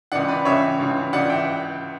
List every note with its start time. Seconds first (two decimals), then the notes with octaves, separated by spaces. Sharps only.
0.12 C#2 C#3 E3 D5 F#5
0.28 B4 D5
0.45 C#2 C#3 E3 C#5 E5
0.80 C#2 C#3 E3
1.13 C#2 C#3 E3 D5 F#5
1.30 E5 G5